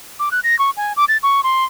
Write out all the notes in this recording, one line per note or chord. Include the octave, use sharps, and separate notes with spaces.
D6
F#6
A#6
C#6
G#5
D6
A6
C#6
C6